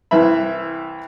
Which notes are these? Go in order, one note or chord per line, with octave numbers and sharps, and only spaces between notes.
C2 E3 B4 E5 B5